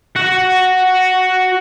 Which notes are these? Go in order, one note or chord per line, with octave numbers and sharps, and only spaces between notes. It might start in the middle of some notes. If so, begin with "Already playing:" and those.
F#4 F#5